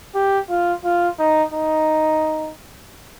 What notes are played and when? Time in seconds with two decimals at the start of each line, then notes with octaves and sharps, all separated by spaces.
0.15 G4
0.50 F4
0.85 F4
1.19 D#4
1.54 D#4